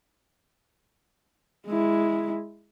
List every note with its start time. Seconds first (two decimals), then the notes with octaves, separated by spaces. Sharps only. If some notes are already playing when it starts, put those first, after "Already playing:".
1.67 G#3 E4